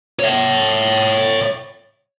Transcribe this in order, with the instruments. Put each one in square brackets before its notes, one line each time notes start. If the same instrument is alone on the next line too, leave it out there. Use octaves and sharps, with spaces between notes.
[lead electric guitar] C#5 E5